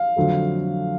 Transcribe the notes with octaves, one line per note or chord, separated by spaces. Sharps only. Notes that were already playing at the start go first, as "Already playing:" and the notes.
Already playing: F5
F2 D3 F#3 A3